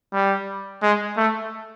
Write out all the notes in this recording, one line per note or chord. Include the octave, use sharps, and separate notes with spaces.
G3
G#3
A3